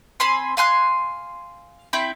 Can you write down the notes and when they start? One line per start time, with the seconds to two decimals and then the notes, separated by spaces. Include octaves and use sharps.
0.20 C4 G#5 B5 C6
0.57 F5 G#5 C6 F#6
1.93 C4 E4 G5 B5